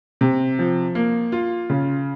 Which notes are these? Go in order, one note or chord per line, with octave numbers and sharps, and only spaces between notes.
C3
F3
A#3
F4
C#3